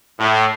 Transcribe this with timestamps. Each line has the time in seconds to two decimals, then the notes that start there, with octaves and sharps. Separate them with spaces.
0.19 A2